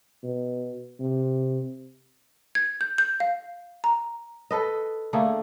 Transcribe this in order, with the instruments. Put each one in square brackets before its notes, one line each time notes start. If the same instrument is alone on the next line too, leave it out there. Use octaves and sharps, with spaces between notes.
[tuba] B2
C3
[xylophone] G#6
G6
G6
F5
A#5
[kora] A4 B4 D#5
D3 A3 A#3 G#4